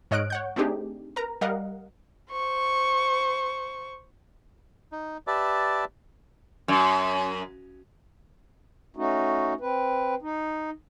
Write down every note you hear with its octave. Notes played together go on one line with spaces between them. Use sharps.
G#2 C#5 D#5 F6 F#6 D7
C#5 F#5 G6
A3 C4 D4 D#4 G4 G#4
A#4 B4 A#5
G3 A#4 D#5 F5 F#5
C5 C#6
D#4
G4 B4 D5 E5 A5
F#2
A3 C#4 D#4 F#4
C4 B4
D#4